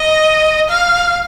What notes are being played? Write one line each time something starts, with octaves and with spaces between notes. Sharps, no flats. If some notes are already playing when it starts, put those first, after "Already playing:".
Already playing: D#5
F5